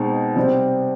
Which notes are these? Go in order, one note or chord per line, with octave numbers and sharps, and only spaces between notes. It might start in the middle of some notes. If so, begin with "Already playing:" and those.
Already playing: B2 G#3 C4 D#4
C3 G3 C4